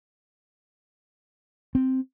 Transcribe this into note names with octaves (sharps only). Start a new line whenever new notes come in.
C4